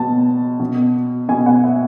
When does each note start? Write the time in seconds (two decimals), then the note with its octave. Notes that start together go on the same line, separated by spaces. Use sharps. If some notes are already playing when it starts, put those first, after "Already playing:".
Already playing: B2 A5
0.60 B2
1.29 B2 G#5
1.46 F#5
1.64 E5